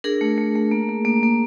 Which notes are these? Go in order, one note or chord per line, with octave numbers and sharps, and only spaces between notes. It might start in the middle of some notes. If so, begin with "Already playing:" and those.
D4 G#4 A#4
A3
A3
A3
A#3
A#3
A#3
A#3